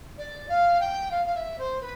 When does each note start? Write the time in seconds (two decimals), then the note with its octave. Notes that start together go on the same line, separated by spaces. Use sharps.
0.18 D5
0.48 F5
0.79 G5
1.10 F5
1.25 F5
1.34 E5
1.58 C5
1.80 B4